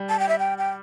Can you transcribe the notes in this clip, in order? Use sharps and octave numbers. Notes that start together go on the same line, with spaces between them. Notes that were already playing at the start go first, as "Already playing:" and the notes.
Already playing: G3
A5
G5
E5
G5
G5